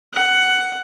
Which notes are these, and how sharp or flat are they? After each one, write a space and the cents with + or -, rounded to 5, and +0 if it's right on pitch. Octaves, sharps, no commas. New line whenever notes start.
F#5 +10